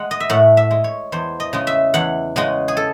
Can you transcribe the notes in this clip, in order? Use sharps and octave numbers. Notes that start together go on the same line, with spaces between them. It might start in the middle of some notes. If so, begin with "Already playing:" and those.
Already playing: G#3 F#5
D#5
E5
A2 F#5
E5
G#3
C#5
E2 C5
D#5
C#3 G#3
E5
E2 F#5
C#3 G#3 F#5
G#4
A4